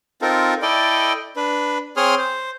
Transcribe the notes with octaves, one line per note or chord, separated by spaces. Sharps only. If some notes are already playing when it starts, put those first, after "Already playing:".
C4 D#4 F4 A4 A#4
E4 A4 D5 D#5 G5
D4 B4
C4 G#4 C#5 C6 D#6 F6
C5